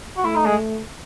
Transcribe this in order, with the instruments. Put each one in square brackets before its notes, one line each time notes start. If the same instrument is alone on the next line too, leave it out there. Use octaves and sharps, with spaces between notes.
[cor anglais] F#4
[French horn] A3 [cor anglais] E4
[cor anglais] D#4
G#3